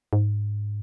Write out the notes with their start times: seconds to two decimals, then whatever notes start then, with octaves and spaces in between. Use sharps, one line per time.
0.13 G#2